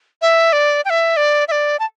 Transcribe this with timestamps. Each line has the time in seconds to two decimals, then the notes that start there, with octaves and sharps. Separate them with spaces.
0.22 E5
0.53 D5
0.85 G5
0.90 E5
1.17 D5
1.48 E5
1.52 D5
1.79 A5